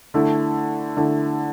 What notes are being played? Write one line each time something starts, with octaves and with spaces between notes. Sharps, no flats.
D3 A3 E4
D3 A3 E4